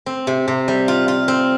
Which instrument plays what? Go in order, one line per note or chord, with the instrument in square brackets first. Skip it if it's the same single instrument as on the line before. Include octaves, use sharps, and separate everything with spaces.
[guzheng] C4
C3
C3
G3
F4
F4
C4